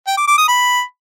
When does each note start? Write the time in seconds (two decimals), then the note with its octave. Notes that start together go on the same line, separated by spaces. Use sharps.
0.07 G5
0.17 D6
0.27 D6
0.38 D#6
0.48 B5